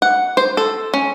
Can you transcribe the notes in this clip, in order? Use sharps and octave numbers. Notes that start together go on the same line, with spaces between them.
F#5
C5
A4
C#4